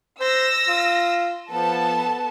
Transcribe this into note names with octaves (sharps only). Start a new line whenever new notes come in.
C5 E6 A#6
F4
F3 B3 A4 A5